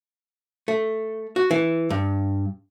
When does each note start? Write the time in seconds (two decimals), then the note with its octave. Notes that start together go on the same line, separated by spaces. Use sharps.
0.68 A3
1.36 F#4
1.51 E3
1.90 G2